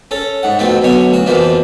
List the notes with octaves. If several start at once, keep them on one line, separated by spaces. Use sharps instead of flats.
C#4 A4
G#2 F#5
F2 B2 A3 B3 C4
B1 B2 D3 C#5 G#5
D2 F#4
F2 B2 E3 F3 A#3